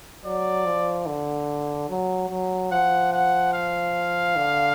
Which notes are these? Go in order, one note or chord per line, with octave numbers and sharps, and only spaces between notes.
F#3 D5
F3
D3
F#3
F#3
F3 F#5
F#5
F5
D3